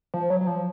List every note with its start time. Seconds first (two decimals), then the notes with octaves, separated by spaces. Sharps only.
0.14 F3
0.30 F#3
0.41 F#3
0.47 F3